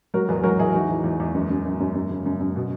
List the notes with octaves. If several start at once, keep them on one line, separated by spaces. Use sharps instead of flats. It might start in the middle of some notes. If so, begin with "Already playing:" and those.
F#3 F#4 A#4
E2 G#4 B4
F#3 F#4 A#4
E2 E4 G#4
E3 D#4 F#4
E3
E2
E2
F#2
F#2
F#2
F#2
F#2
C#3
F#2
F#2
B2